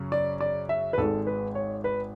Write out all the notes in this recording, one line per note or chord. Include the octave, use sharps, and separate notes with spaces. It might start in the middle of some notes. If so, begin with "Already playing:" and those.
Already playing: F#2 C#3
D5
D5
E5
B4
G#1 G#2 G#3 A4
B4
C#5
B4